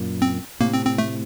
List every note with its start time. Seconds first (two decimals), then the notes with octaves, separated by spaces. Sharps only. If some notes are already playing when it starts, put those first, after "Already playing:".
Already playing: F#2 A#2
0.22 C4
0.60 A2 C3 A#3
0.73 C4
0.86 C4
0.98 A3